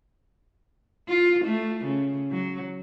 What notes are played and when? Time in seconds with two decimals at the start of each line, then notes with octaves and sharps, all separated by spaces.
1.09 F4
1.45 A3
1.84 C#3
2.31 F#3